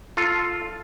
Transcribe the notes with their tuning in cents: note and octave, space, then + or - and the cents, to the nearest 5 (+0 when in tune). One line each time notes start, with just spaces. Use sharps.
F4 +0 A4 +0